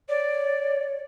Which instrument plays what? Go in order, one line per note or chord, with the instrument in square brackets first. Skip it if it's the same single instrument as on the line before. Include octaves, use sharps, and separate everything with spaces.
[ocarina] C#5 [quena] D5